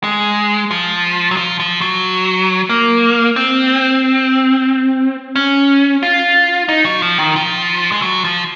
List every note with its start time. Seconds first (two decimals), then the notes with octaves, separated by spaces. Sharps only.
0.04 G#3
0.71 F3
1.31 F#3
1.37 F3
1.60 F3
1.81 F#3
2.69 A#3
3.36 C4
5.36 C#4
6.03 F4
6.69 D#4
6.85 F#3
7.02 F3
7.18 D#3
7.36 F3
7.92 G#3
8.02 F#3
8.24 F3